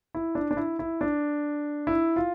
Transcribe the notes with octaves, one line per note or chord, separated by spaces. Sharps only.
E4
D4
D4
E4
E4
D4
E4
F4